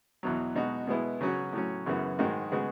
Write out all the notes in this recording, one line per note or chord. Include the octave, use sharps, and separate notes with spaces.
E2 B2 F#3
B2 G#3 D#4 F#4
B2 G#3 B3 E4
C#3 F#3 C#4 F#4
A2 F#3 C#4
F#2 C#3 E3 B3 F#4
G#2 D#3 G#3 D#4 F#4
C#3 G#3 B3 F#4